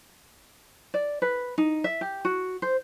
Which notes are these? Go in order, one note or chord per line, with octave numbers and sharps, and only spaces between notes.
D5
B4
D#4
E5
G4
F#4
C5